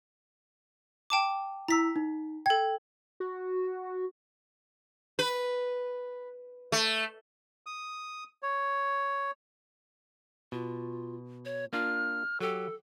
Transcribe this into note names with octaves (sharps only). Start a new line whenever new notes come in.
G5 A5 D6
E4 A#5 E6 B6
D#4
A4 G5 G#6
F#4
B4
A3
D#6
C#5
B2 F4
C#5
A#3 D4 F4 F6
F#3 G4 A4